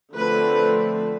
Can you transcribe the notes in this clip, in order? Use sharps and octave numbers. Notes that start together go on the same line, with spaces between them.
D3 F3 A3 C4 B4